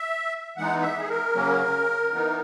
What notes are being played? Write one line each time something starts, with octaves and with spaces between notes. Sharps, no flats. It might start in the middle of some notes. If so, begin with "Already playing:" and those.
Already playing: E5
E3 G#3 B3 D#4 F#5
E5
G#4
A#4
C#3 F#3 A#3 C#4
E3 B3 D#4